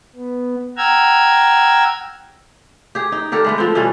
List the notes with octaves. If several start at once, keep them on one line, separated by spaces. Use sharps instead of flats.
B3
F#5 G5 A#5 E6 F6 G#6
G4 G#4
D#4
D3 G4 A4 A#4
G#3 A3 B3
F3 C4
B2 E3 G3 C#4